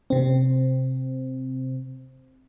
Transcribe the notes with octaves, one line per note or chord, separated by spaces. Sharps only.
C3 C4